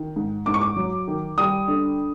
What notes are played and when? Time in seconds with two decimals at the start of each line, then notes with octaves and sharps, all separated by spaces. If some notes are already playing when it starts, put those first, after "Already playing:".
Already playing: D#3
0.16 G#2
0.46 G#2 D6
0.54 C#6
0.61 D6
0.76 F#3
1.08 D#3
1.38 G3 D#6
1.68 D3